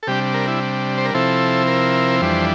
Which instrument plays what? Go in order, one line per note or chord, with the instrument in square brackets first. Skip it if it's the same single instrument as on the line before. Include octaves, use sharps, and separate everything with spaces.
[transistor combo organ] A4
C3 G3 D4 G4
A#4
E4
C5
A#4
C3 F3 C4 E4 A4
A#4
F2 E3 G3 D4 C5